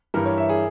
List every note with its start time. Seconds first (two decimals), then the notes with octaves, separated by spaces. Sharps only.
0.14 G2 E3 G3 A#4
0.26 C#5
0.38 E5
0.49 G#4